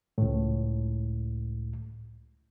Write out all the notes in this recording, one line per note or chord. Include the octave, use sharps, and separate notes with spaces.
C#2 A2